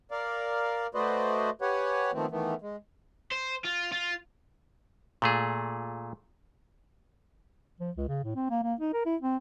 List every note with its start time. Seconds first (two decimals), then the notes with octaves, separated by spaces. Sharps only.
0.11 A#4 D5 F5
0.95 A3 F#4 B4 C5 D5 D#5
1.61 G4 B4 C#5 F#5 G#5
2.13 D#3 F3 A3 B3 C4
2.31 D#3 E3 A3 B3
2.61 G#3
3.31 C5
3.64 F4
3.92 F4
5.22 A#2 A3 G#4
7.80 F3
7.97 C#2
8.08 C#3
8.24 A2
8.36 C4
8.50 A#3
8.63 A#3
8.80 D#4
8.93 A#4
9.05 E4
9.21 C4